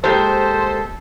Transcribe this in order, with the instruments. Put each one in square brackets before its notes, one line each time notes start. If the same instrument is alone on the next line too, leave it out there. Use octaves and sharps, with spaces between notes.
[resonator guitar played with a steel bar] A#2 G#3 G4 [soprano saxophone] A4 [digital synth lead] C5